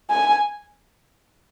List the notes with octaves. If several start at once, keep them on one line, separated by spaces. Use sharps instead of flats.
G#5